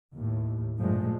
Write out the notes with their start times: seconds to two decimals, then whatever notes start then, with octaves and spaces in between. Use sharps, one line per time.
0.13 D#2 A2
0.79 G2 A#2 F3 G#3 A3